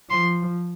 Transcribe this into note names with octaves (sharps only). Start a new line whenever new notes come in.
F3 C6